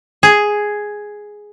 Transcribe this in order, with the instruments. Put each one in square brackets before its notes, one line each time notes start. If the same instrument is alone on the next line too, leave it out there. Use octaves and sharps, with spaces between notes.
[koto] G#4